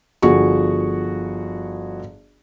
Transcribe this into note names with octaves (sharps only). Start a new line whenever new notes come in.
G1 F3 F#4 G#4 C#6